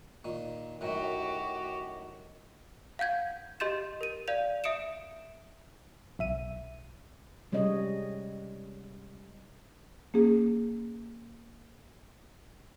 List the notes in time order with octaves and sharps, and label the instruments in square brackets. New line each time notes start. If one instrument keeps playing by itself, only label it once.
[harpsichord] A#2 D#3
[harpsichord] F#2 A2 D#3 [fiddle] F#4 G4
[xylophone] F5 F#5 G6 G#6
G4 D#5 C6 G6 A6 E7
A#4 D#7
D5 F5 G6 F7
E5 D#6 C#7 D7 E7
[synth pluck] B1 E5 D#7
[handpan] C3 G3 G#3 C#4 C#5 D#5
[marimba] A#3 C#4 G#4